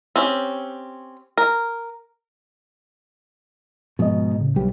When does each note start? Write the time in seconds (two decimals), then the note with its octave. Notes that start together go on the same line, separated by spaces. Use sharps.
0.16 C4 C#4 G4
1.38 A#4
3.99 G#2 B2 F3 D#5
4.41 A2 C#3
4.56 B1 G3 G4